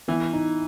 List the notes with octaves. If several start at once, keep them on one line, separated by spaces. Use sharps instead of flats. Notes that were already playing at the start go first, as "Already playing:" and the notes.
E3 B3
D#4